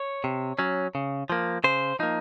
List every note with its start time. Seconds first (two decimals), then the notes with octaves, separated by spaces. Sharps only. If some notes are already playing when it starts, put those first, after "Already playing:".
Already playing: C#5
0.24 C3
0.59 F#3 C#4
0.95 C#3
1.30 F3 A#3
1.64 C#3 C5
1.99 F3 A#3 D#4